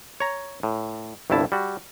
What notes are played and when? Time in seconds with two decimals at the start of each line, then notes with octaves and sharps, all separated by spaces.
0.20 C#5 A#5
0.63 A2
1.30 G1 C2 G2 E4 A5
1.52 G3 F#4